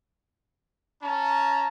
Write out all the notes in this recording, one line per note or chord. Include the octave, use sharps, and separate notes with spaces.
C#4 A5 A#5